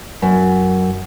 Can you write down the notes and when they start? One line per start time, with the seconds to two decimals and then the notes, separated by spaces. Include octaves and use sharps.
0.22 F#2